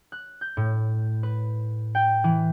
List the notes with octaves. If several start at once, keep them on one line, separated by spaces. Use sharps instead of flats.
F#6
G6
A2
B4
G5
E3